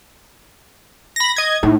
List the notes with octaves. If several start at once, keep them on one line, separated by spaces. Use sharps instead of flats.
B5 A#6
D#5 G#6
A2 D#4